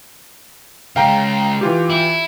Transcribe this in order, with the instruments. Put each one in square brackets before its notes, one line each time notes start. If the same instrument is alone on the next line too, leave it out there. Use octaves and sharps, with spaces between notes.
[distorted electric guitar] C#3 G#3 [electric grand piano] F5 G5 A#5
[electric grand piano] E3 F4 G4
[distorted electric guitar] E4